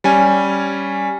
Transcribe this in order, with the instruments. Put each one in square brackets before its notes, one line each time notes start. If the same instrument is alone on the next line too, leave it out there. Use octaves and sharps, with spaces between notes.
[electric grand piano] G3 C#4 G#5